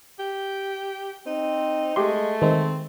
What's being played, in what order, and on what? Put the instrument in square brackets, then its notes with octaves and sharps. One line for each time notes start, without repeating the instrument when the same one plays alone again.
[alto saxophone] G4
[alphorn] C4 [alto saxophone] D#4
[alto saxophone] G#3 [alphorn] A3 [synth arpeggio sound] G4 C6
[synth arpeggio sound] D#3 G#3 [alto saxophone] C4